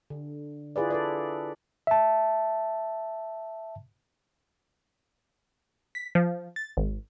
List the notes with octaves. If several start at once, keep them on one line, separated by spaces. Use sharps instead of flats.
D3
E4 F4 G#4 B4 D5
A4 B4 D5
E5 A5
B6
F3
A6
G#1